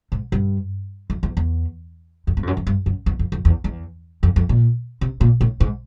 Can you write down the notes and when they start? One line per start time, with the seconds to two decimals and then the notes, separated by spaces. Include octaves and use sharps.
0.12 G#2
0.32 G2
1.10 F2
1.23 E2
1.37 E2
2.27 F2
2.37 G2
2.43 F2
2.47 F#2
2.57 F2
2.67 G2
2.86 F#2
3.06 E2
3.19 F2
3.32 F2
3.45 E2
3.64 E2
4.23 F2
4.36 F2
4.49 A#2
5.01 C3
5.21 A#2
5.41 A2
5.60 G#2